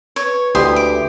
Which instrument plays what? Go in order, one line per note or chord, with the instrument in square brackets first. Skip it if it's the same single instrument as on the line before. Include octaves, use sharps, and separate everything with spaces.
[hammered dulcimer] B4 [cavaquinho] C#5
[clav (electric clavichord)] D2 E4 [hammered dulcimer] E3 G#3 A3 [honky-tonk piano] G4 [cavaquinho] C6 D#6
[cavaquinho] D6